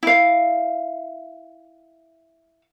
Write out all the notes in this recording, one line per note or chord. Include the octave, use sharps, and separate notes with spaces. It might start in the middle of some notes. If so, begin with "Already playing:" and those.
E4 F5